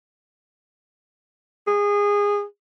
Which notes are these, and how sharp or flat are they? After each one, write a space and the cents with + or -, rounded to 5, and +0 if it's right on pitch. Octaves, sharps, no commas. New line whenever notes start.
G#4 -20